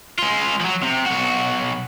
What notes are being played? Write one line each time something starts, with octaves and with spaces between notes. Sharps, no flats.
G#3 F4
F3 F#3
C3
B1 F#4